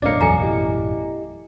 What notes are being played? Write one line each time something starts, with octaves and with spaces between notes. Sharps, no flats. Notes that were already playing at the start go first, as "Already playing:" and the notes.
A1 F#2 B2 A#3 D4 C#5 D#5 C#7
E2 F#3 A4 G#5 A#5 C#7
E4 G4 D#5